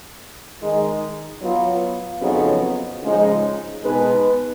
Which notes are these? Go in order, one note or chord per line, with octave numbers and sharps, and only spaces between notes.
D#3 G#3 D#4
F#3 B3 F4
F2 C#3 F#3 B3 D#4
C#3 F3 G#3 D#4
B2 G#3 D#4 G#4 B4